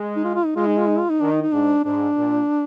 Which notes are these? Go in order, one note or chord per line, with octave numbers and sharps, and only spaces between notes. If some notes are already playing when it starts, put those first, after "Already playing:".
Already playing: G#3
D#4
F4
F4
D#4
G#3 F4
D#4
F4
D#4
F4
D#4
D#3 D4
D#4
D#4
G#2 D4
G#2 D4
A#2